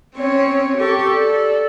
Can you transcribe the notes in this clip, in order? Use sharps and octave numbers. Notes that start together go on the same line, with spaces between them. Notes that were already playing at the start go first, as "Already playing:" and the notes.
C4 C#4 C#5
G4 A4 C#6
A4 D5